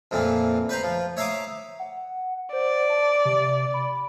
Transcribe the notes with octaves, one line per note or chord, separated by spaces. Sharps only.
F2 A#2 E3 A#3
B4 C5 A#5
F3
C#5 E5 F5 A#5 D6 D#6
F#5
C5 D5
A5
C3
B5